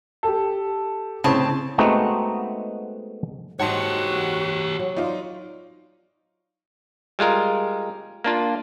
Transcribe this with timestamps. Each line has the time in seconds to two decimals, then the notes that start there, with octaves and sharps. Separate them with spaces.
0.23 G4 A4
1.24 A2 C#3 C4 C#4 A5
1.78 G#3 A3 B3 C4 D#4 F#4
3.59 G#2 F#4 G4 C#5 D#5 F#5 A5 C6
4.79 F#3
4.97 D#4 F4 C5 D5
7.19 G3 G#3 F4 A#4
8.24 A#3 D4 F4